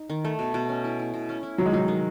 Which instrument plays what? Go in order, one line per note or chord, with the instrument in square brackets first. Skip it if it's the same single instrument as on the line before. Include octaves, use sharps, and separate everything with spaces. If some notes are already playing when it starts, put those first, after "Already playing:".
Already playing: [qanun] D#4
D#3
A3
B2
B2
C#4
E4
E4
B2
C#4
E4
[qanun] D#3 [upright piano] F#3
[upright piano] G#3
[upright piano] F#3 [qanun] D#4
[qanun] D#3